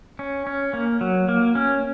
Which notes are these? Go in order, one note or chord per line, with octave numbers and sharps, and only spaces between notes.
C#4
C#4
A#3
F#3
A#3
C#4